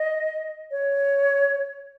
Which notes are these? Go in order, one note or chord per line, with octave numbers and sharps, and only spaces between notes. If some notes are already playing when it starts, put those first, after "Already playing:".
Already playing: D#5
C#5